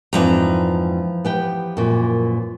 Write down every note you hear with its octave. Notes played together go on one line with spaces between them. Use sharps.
F2 G#2 E3 F3 D4 A#5
B3 G4 G5
F#2 A#2